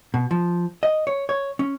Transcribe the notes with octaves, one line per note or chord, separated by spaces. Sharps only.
B2
F3
D#5
C#5
C#5
C#4